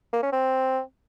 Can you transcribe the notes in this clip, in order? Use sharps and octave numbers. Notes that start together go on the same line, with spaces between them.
A#3
C#4
C4